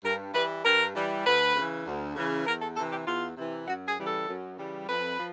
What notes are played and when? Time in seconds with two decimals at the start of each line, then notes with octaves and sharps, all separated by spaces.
0.03 G2 A#4
0.33 E3 G3 B4
0.64 G2 A#4
0.95 E3 G3
1.25 D2 B4
1.55 C#3 E3
1.85 D2
2.15 C#3 E3
2.46 E2 A#4
2.61 A4
2.76 C3 E3 A4
2.91 G4
3.05 E2 F4
3.36 C3 E3
3.66 F#2 F#4
3.87 G#4
3.97 C#3 E3 G3
4.06 A4
4.27 F#2
4.57 C#3 E3 G3
4.87 F2 B4
5.17 F3